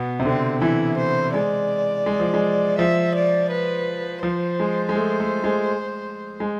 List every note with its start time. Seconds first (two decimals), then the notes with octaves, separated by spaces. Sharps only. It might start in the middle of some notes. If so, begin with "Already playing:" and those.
Already playing: B2 B3
0.20 C3
0.25 D3 C4
0.62 E3 E4
0.97 C5
1.34 G#3 D5
2.06 G#3
2.20 F3
2.34 G#3
2.79 F3 E5
3.15 D5
3.51 B4
4.23 F3 C5
4.60 G#3
4.89 G#3
4.96 A3
5.20 A3
5.44 G#3
6.40 G#3